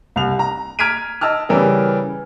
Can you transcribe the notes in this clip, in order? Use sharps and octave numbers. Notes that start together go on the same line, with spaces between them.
C2 F7
A#5
A#5 F6 G#6 B6 D7 D#7
D#5 A5 E6 F6
C#3 E3 G3 A#4